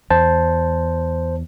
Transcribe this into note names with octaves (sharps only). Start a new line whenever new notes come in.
E2 C5 A5